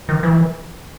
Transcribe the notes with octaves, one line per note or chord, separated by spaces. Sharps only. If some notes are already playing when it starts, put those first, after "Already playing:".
D#3
E3